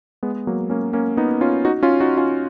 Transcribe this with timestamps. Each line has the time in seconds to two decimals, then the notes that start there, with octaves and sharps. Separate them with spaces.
0.23 G#3 B3
0.47 F#3 A#3
0.70 A#3 C#4
0.93 A#3 C#4
1.17 B3 D#4
1.41 C#4 F4
1.65 D#4 F#4
1.83 C#4 F4
2.00 D#4 F#4
2.17 C#4 F4